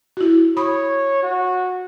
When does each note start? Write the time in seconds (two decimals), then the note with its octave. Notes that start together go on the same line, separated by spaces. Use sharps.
0.17 E4 F#4
0.57 C#5 B5 D#6
1.23 F#4